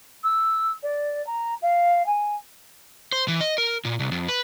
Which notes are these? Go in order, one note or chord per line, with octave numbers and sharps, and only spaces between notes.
E6
D5
A#5
F5
G#5
C5
E3
D#5
A#4
A#2
C2
F2
B4